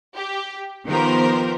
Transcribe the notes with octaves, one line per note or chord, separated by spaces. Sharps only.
G4
D#3 F3 B3 G4 A#4 C5